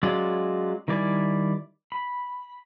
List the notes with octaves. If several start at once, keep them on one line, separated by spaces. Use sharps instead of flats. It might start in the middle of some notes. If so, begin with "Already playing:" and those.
F#3 G#3 C#4 F4 D5
D#3 G3 E4 D5 G#5
B5